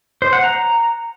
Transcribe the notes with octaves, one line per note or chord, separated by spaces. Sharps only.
C5
F#5
A#5